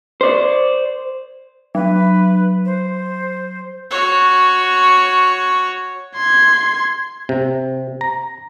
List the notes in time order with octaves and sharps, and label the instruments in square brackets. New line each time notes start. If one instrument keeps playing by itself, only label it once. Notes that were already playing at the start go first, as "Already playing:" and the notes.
[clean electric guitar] C5 D5
[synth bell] F#3 [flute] B4
[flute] C5
[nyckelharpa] F#4 C#5
[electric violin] C6 G#6
[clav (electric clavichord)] C3
A#5